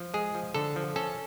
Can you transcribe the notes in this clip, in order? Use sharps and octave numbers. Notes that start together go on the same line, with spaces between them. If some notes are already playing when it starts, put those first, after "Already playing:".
Already playing: F3
G#3 G#4
F3
D3 A4
F3
C#4 A4